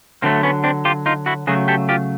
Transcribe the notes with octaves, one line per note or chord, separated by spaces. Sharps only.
D3 F#3 A3 A#3 C4
B3 C#4
C4 D4
F4 G4
D#4 F4
E4 F#4
C#3 F#3 A3 F#4 G#4
G4 A4
F4 G4